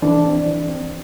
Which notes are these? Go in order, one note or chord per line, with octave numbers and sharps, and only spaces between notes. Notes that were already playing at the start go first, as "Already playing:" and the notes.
E3 D4
C4
E3
C4